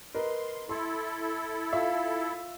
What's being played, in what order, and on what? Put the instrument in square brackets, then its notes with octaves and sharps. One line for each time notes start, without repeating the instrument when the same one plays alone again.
[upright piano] A#4 B4 D#5 [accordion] C6
[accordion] E4 A4 [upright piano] C6
[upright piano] F4 E5 F5